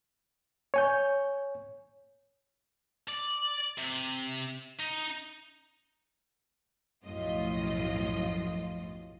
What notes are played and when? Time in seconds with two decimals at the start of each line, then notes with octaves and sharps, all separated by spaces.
0.74 C#5 G#5 G6
3.09 D5
3.78 C3
4.79 D#4
7.05 B1 F#2 A2 F3 F4 D#5